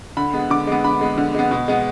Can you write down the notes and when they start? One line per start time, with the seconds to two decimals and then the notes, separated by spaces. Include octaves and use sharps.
0.17 D3 B5
0.33 G#3 B3
0.50 D3 D6
0.67 G#3 B3
0.84 D3 B5
1.01 G#3 B3
1.18 D3
1.35 G#3 B3
1.51 B2
1.68 G#3 B3